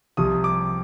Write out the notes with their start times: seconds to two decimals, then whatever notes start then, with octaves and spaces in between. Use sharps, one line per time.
0.17 C2 C3 F3 D#6
0.44 D6